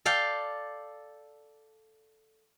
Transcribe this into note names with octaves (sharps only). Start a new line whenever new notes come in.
A4 D5 F5 G5